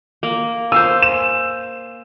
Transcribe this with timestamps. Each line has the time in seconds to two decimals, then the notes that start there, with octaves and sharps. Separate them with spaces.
0.23 A#3
0.72 C5 F5 G#5 E6
1.02 E7